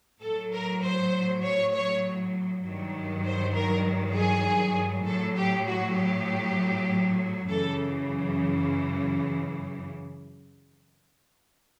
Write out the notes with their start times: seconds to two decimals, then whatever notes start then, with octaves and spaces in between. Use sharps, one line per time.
0.22 A2 F#3 A4
0.53 A#4
0.83 C5
1.44 C#5
1.74 C#5
2.64 G2 D#3 F#3
3.26 C5
3.56 A#4
4.16 G#4
5.07 A2 F#3 A4
5.37 G4
5.68 F#4
5.98 G4
7.49 F#2 C#3 E3 A4